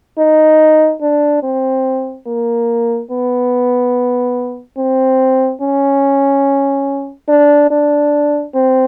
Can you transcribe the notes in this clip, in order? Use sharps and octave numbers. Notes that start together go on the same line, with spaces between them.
D#4
D4
C4
A#3
B3
C4
C#4
D4
D4
C4